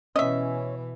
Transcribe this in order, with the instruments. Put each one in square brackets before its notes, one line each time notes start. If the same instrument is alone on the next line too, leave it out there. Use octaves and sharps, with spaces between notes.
[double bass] B2 E3 [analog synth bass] C#4 [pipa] D#5 E5